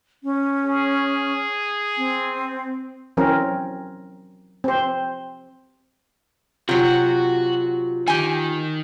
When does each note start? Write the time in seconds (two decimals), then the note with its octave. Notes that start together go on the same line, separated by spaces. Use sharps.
0.24 C#4
0.65 G#4
1.98 C4
3.17 E3 F#3 C4 C#4 A#4
4.64 C4 C5
6.69 C3 F#3 F4 F#4
8.08 D#3 G4 G#5